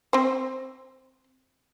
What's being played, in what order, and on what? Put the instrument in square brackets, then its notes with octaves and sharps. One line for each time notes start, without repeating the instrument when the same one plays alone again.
[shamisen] C4 C5